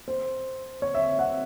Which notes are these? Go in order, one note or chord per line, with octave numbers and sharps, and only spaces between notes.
C5
C#5
E5
F#5